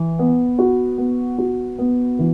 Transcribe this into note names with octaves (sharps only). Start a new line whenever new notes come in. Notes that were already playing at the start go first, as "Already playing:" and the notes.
Already playing: E3
B3
F#4
B3
F#4
B3
E3